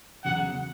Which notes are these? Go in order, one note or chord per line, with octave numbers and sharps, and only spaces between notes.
E2 C#3 F#3 F#5